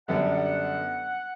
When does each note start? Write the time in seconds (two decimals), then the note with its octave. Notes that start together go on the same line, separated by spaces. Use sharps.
0.08 F#2 D3 G3 B3 D4 F#5
0.32 F#5